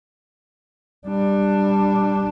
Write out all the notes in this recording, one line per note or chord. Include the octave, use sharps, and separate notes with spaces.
G3 D4